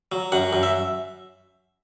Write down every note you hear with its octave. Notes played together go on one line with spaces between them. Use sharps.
F#3
F#2 F#5
F#2
E5